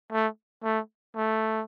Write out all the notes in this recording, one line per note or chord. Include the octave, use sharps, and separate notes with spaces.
A3
A3
A3